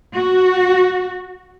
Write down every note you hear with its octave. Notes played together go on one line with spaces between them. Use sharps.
F#4